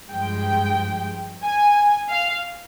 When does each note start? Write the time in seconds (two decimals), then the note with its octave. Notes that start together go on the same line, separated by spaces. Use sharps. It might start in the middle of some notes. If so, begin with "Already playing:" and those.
0.11 G2 F3 G#3 G5
1.43 G#5
2.10 F5